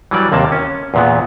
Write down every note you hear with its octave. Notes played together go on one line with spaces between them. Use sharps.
E3 F#3 G3 D5
D#2 C3 A#3 A5
C#4
E2 A#2 B3